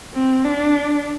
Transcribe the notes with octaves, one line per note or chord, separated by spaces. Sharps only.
C4
D4